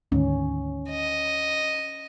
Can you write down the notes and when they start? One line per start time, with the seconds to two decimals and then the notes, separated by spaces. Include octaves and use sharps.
0.12 D2 G#2 D#3 C#4
0.90 D#5